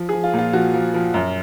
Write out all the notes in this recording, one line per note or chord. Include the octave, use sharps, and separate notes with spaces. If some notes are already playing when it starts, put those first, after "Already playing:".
Already playing: F3
G#4
F3
F4
A#2
F4
F3 F#4
F3
F3
F#2